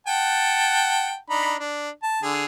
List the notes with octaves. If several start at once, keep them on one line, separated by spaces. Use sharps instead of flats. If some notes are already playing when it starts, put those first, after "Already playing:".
F#5 G5 A5
D4 D#4 B5
D4
A5
D3 G#4